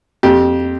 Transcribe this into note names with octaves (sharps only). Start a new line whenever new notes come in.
F2 G4